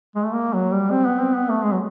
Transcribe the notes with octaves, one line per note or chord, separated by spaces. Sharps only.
G#3
A3
A#3
F#3
G3
C4
B3
C4
B3
A3
G#3
F#3